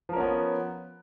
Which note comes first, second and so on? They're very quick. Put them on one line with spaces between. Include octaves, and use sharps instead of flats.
F3 A#4 C#4 B3